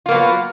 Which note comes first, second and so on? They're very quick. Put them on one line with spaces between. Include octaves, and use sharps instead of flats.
F4 A#3 B3 F#3